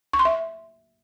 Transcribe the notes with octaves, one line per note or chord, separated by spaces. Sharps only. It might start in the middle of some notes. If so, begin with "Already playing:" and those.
C#6
C6
E5